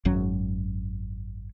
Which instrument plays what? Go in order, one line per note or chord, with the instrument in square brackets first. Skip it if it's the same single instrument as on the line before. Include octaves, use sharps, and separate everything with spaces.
[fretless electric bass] G#1 F#2 F#3 C#4